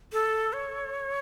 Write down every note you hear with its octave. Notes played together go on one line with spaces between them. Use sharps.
A4
C#5